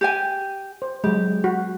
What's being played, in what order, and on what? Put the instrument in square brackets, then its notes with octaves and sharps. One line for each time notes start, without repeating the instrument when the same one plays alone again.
[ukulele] G4 G5 G#5
[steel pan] C5
[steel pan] F#3 G#3 [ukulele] G4
[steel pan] F#4